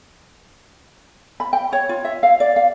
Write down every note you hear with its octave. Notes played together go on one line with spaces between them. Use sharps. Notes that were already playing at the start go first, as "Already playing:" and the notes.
B5
G5
C#5
F4
E5
F5
D5
F5